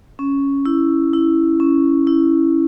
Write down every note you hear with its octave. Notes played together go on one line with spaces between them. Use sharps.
C#4
E4
E4
C#4
E4